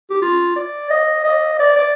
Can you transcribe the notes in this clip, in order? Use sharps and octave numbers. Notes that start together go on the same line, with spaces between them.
G4
F4
D5
D#5
D#5
D5
D5